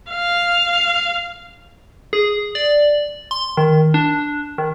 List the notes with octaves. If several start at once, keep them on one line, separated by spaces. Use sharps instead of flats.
F5
G#4
D5
C6
D#3
D4
D#3